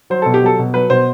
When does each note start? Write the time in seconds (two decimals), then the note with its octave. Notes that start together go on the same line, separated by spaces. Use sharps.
0.10 F#3 C5
0.22 B2 A4
0.34 G4
0.43 F#3 A4
0.59 B2
0.74 F#3 B4
0.90 B2 C5